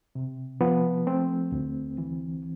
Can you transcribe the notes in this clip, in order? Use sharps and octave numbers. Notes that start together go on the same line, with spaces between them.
C3
F3 B3
A3 C4
D2
E3